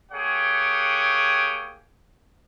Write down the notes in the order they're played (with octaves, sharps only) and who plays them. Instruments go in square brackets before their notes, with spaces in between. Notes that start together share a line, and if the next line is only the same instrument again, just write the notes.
[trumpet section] A#3 G4 G#4 C#5 F#5 G5